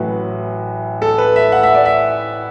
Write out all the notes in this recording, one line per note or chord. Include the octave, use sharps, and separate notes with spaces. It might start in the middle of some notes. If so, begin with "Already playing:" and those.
Already playing: A1 A2 F#3 B4
A4
B4
E5
F#5
E5
D5
E5